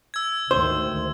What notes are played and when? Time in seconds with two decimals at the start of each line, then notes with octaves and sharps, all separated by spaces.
0.14 E6 G#6
0.51 D2 G#2 D#3 C5